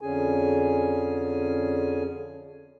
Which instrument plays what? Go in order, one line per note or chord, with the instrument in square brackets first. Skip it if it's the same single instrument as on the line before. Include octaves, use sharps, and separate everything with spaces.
[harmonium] F2 D3 C#4 G#4 G#5